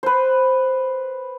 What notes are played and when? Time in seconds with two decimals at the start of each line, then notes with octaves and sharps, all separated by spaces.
0.03 B4 C5